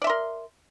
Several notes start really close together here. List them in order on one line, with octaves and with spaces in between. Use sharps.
D5 E5 C6 A#4